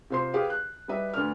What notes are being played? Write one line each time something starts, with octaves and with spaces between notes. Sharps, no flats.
C3 F4 C5 C6 C7
G4 G#4 B4 F5
F#6
G3 D#4 B4 E5
D2 D3 B4 F6